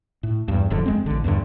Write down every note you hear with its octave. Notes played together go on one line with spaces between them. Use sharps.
A2
E2 G2
D#1 F2 D3
F#1 G#3 C4
A1 D3
E2 G2 A#2 D3